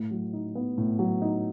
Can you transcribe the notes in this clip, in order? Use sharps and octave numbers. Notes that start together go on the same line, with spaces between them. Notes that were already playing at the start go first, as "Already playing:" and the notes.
Already playing: A2
F#3
D#4
B3
A2
F#3
D#4